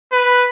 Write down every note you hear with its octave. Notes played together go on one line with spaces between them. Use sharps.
B4